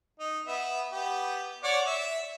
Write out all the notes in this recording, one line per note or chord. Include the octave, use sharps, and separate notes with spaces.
D#4
B3 E5
B3 G4
C#5 D5 F#5
E5